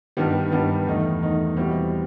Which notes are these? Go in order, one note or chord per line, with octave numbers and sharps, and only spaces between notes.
G2 D#3 G3 B3
G2 D#3 G3 B3
E2 D#3 A3 D#4
E2 D#3 A3 D#4
E2 B2 G3 C4 E4